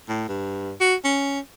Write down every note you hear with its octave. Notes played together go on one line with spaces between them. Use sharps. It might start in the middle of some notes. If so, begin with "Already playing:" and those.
A2
G2
F#4
C#4